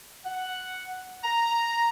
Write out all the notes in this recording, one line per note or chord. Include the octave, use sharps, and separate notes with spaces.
F#5
A#5